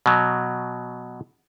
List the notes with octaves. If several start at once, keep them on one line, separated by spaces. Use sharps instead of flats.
B2 F#3